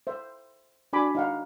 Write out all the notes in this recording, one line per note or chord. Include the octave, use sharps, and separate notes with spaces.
C5 E5
D4 F#4 G#5 B5 D6
D#4 F5 F#5